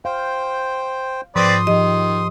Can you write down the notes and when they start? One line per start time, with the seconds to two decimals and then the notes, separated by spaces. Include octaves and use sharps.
0.05 C5 F5 G5
1.36 G#2 F3 C4 B4 D5 C6 D#6
1.67 D#3 F3 G4 D#5